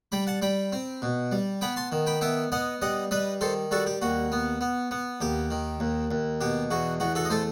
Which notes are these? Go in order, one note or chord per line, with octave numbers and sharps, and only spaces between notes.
G3 G5 B5
F#5 A5
G3 G5 B5
C4
B2
G3
B3 G5 B5
A5 C6
D#3
G5 B5
B3 E5 G5
B3 D#5 F#5
G3 D#5 F#5
G3 B4 D#5
D#3 A4 C5
G3 F#4 A4
G4
D#2 F#4
B3
B3
B3
D#2 G4
D#3
D#2
D#2
B2 G4
E2 F#4
E2 F#4
F#4 A4
D#5
A3 A4 C5